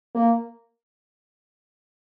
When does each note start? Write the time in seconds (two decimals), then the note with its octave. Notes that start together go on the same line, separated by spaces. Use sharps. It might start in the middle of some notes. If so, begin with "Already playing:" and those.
0.15 A#3